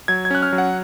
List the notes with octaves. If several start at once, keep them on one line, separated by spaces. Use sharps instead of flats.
F#3 G#6
G#6
C#4 F#6
F6
F#3
F#5